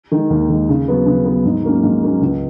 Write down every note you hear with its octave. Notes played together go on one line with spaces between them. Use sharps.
D#3 G#3
D#2
D#3 G#3
C#3
F#3 B3
C#3
F#3 B3
G#2
F#3 A#3 C#4
G#2
F#3 A#3 C#4
C#2